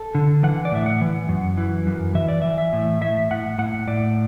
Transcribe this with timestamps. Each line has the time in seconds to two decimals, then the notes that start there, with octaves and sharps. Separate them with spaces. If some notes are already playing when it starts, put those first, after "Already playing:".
Already playing: A4
0.15 D3
0.43 E3 F#5
0.65 D5
0.72 A2 E5
0.86 F#5
1.01 E3
1.29 F#2
1.58 E3
1.87 F#2
2.15 E3 E5
2.28 D5
2.42 E3 E5
2.58 E5
2.73 A2
3.01 A2 E5
3.31 A2 F#5
3.58 A2 F#5
3.87 A2 D5